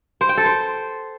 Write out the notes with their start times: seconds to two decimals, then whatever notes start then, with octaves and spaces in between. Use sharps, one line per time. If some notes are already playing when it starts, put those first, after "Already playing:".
0.21 C5
0.29 G5
0.37 A4
0.46 C5